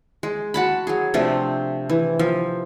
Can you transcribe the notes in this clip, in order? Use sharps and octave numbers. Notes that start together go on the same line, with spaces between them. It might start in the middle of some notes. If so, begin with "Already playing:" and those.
G#3
F#4 A5 B5
F#3 G#4
C3 F3 A3 D4
E3
F3